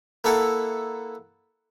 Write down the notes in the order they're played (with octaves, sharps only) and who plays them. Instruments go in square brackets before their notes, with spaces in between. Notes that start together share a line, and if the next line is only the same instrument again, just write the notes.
[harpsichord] A#3 E4 A4 F#5